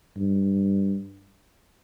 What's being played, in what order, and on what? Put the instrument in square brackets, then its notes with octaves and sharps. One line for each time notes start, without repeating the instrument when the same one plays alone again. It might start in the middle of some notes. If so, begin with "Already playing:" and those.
[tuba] G2